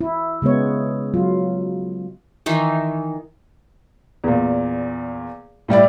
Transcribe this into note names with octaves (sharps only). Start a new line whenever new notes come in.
E4
C#3 G#3 B3 C#5
F#3 F4
D#3 E3 D#4
E2 A#2
A2 G3 E4 D5